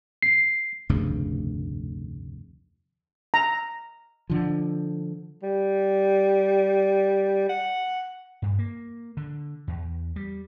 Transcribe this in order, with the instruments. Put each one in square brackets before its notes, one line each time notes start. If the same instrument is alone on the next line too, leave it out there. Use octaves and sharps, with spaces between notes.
[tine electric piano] C7
[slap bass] F1 D2 G2 C#3
[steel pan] A#5
[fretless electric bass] D3 F3
[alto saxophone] G3
F#5
[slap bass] G2
A#3
D3
E2
G3